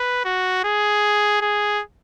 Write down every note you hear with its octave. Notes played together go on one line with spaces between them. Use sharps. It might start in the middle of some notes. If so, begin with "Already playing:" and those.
Already playing: B4
F#4
G#4
G#4